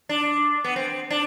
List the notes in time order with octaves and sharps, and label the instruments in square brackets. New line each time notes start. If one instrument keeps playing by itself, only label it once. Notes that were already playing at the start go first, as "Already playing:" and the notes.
[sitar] D4
B3
C4
D4